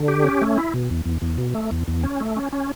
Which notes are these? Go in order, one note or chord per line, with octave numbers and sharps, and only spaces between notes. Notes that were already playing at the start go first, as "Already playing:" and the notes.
Already playing: D3
G4
C#4
A3
E4
B2
E2
E2
E2
B2
A3
E2
E2
C#4
A3
C#4
C#4